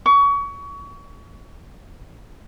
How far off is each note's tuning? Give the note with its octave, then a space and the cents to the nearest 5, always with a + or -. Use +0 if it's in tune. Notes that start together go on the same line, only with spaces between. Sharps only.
C#6 +30